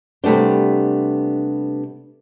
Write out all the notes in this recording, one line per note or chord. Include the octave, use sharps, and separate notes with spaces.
C3 G3 A3 B3 D4